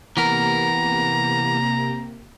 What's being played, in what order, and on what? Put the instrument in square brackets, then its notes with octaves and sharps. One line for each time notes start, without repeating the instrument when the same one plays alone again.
[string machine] C3 A#3 G4 [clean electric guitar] E3 B3 A#4 [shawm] A#5